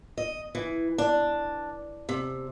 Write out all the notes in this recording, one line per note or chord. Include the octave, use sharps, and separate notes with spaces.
D#5
E3
D4
C3